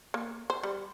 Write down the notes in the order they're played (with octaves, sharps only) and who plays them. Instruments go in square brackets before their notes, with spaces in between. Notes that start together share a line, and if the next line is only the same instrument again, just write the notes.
[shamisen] A#3
C5
G3